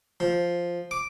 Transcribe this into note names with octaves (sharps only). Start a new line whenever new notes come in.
F3
D6